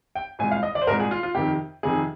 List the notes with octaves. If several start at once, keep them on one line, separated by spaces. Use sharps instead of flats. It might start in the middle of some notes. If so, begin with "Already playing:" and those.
G5
C2 A#2 G#3 G#5
F5
D#5
D5
C5
C2 A#2 G#3 A#4
G#4
F4
F4
F2 C3 D#3 G4
F2 C3 D#3 G#4